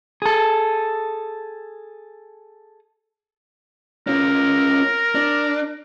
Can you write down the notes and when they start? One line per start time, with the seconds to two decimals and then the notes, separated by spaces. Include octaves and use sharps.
0.22 G#4 A4
4.07 C#4 F4 A#4
5.15 D4